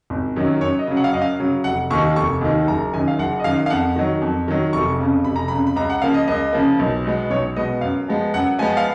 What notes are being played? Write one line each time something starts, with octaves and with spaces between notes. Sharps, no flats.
G#1
F#2 D#3 F#3
F#2 C#5
D#5
C#3 F#3
F#5
F5
F#2 D#5
F5
C#3 F#3
F1 F#5
D#2 D#3 C#6
F1 C#6
D#2 D#3
F#1 A#5
F#2 D#3 G#5
F5
F#1 F#5
D#5
F#2 D#3 F5
F5
F2 F#5
D#3 F#3
F2
D#3 F#3
F1 C#6
F2 C#3
F1 B5
A#5
F2 C#3 B5
B5
C#2 A#5
F#5
C#3 F3 A#3 F5
D#5
C#2 D#5
C#3 F3 A#3
B1
B2 G#3 B3
B1 C#5
B2 G#3 B3 D#5
F#2 F5
F3 G#3 B3
F#2 F#5
F3 G#3 B3 G#5
F5